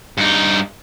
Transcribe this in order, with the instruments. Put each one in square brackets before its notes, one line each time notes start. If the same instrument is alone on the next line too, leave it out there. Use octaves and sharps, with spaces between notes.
[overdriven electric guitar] G2 D#4